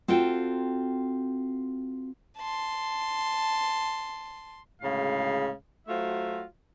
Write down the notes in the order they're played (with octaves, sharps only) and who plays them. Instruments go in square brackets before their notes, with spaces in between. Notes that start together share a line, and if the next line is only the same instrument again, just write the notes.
[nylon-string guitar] C4 F4 F#4 A4 G5
[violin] A5 C6
[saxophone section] D2 A2 C#3 G#3 F5
F#3 A3 F4 F#4 C5 E5